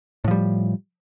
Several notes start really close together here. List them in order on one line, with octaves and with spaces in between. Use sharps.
A2 F3 G3